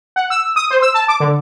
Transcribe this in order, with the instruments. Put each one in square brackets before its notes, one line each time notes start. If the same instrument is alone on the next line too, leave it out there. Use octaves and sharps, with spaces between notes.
[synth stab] F#5
E6
D#6
C5
E6
A5
D6
D3